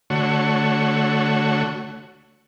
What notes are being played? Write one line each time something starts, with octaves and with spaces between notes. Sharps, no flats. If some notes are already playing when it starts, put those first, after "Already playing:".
D3 A3 F#4 C#5